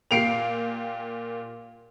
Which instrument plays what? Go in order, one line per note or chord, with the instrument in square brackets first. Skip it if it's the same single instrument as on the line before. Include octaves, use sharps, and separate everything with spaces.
[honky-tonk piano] A#2 A#3 G4 [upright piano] C7 D7 F7